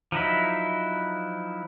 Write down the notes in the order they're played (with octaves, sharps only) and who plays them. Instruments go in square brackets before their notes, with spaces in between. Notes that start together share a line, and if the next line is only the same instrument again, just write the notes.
[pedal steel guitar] F3 F#3 D#4 E4